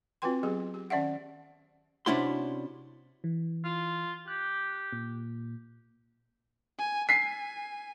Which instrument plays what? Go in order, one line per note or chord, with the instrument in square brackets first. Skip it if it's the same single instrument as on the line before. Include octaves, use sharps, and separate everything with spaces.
[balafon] C4 F4 F#4 B4 G5 C6
F#3 B3 G4 G#4
G4
D#3 C#4 D5 E5 F#5
[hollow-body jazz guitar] C3 C#4 D4 E4 F#4 C6
[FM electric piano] E3
[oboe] F4
[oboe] G4 [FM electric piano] F#6
[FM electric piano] A#2
[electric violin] G#5
[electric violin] G#5 [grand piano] B6 C7